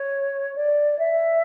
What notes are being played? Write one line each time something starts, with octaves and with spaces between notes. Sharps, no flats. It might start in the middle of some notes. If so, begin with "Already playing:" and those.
Already playing: C#5
D5
E5